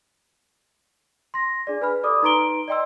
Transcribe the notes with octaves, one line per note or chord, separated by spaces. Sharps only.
C6 A#6
D4 G#4 D5
B4 G#5 B5 F6
G4 A4 D5 D6 D#6
D#4 B4 A#5 C6 D7 G7
D5 D#5 G5 C6 E6